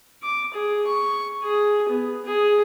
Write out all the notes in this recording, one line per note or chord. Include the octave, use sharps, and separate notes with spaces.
D6
G#4
C#6
G#4
B3
G#4